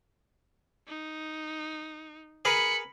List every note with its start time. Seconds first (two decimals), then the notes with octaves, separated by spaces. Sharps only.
0.88 D#4
2.45 G#4 A#4 B4 B5 C#7